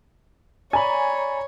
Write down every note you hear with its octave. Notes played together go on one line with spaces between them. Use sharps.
C#5 D5 G#5 A#5 B5